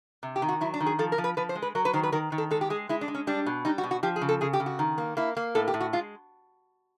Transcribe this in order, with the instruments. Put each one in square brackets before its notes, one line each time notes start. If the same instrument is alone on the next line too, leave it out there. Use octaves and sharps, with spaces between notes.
[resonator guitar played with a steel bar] C3
G4
D#3
F#4
F#3 E4
D4
D#3
G#4
F3 A4
A#4
F3
B4
F3 B4
C5
G#3
B4
F#3 A#4
B4
D#3 C5
B4
D#3 A#4
D#3
A4
G#3 A4
G4
G#3 G#4
G#3 E4
D4
G#3
C#4
G3 D4
B2
G3 D#4
F#4
B2
F#4
F3 G4
G#4
C#3
A4
C#3 G#4
G4
C#3
F#4
D#3
A#3
A#3 E4
A#3
A2 A4
G4
A2
F#4
G#3 F4